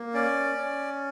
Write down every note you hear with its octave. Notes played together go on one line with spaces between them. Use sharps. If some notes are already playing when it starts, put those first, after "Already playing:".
Already playing: A#3
C#4 D5
C#4